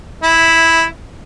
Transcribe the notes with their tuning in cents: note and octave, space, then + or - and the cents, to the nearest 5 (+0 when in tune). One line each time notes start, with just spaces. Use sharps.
E4 +0 E5 -20